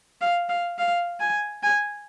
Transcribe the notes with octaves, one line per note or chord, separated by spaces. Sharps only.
F5
F5
F5
G#5
G#5